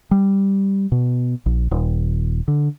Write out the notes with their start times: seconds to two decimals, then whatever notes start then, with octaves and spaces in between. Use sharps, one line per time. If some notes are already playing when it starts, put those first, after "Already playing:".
0.11 G3
0.92 B2
1.46 A#1
1.71 D#1
2.48 D3